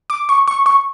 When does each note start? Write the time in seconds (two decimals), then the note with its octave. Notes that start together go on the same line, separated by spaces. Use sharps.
0.10 D6
0.29 C#6
0.48 C#6
0.66 C#6